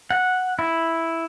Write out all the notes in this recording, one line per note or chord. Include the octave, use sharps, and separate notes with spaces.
F#5
E4